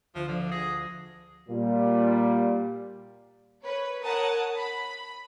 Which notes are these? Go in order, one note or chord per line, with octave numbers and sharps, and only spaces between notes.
D2 F3
D3 F3
G#4 A#6
A#2 G3
B4 C#5
A#4 C#5 F#5 A5 D#6
B5